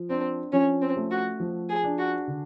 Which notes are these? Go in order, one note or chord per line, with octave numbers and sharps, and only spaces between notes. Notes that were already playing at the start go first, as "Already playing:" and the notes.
Already playing: F3
C4 D4
F3 C#4
C4
A3
F#4
F3
G#4
D4
F#4
D3